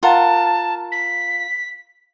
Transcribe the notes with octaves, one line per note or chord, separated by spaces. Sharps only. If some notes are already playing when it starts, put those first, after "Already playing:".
F4 A#4 F#5 A5
B6